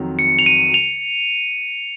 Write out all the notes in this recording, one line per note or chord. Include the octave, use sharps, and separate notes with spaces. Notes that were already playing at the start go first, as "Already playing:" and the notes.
Already playing: F2 D#3 F#3
C#7
F7
D#7
F7